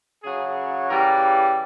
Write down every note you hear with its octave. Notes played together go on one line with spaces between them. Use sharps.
C#3 F#3 G#4
C#3 E3 G3 A#4